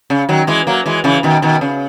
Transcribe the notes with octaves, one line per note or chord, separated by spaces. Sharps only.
C#3
D#3 F#3
E3 G#3
F#3 A#3
E3 G#3
C#3 E3
B2 D#3
B2 D#3
C#3